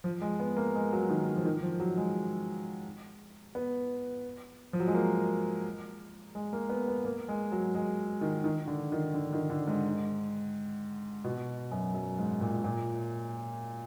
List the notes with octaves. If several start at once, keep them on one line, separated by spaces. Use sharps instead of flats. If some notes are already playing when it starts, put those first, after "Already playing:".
F3
G#3
B3
A#3
G#3
F#3
D#3
F3
D#3
F3
F#3
G#3
B3
F3
F#3
G#3
A#3
G#3
A#3
B3
B3
A#3
G#3
F#3
G#3
D#3
D#3
D3
D#3
D3
D#3
D3
G#2
B2
F#2
F#2
G#2
A#2
A#2